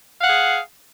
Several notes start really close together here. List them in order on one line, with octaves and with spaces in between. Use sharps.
F5 F#5 G#4